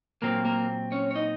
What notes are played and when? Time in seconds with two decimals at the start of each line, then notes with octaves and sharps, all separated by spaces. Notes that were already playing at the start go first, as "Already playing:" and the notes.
0.22 A#2 F#3 A#3 C4 A#4
0.45 A#3 A#4
0.92 C#4 C#5
1.11 C#5
1.15 D#4 D#5